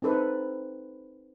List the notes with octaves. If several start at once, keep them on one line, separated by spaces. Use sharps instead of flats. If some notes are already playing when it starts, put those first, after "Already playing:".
C4 D#4 A4 B4 C5